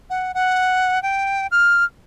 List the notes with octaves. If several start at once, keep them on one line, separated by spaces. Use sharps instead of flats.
F#5
F#5
G5
F6